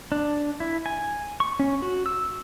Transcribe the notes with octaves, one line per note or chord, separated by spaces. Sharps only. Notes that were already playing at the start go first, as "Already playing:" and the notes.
D4
E4
G#5
C#6
C#4
F#4
E6